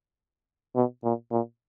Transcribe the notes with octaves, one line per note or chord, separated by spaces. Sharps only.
B2
A#2
A#2